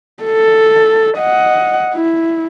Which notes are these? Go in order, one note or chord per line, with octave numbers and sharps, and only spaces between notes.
A4
D#5 F#5
E4